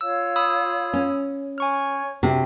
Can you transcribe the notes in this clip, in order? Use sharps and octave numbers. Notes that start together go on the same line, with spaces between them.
F4 C#5 F5 E6
B5 D#6 E6
C#4
C#5 G#5 C#6 F6
C3 D4 F#4